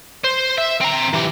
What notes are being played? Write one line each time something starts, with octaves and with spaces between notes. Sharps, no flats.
C5
E5
C4 A#5
E3 G4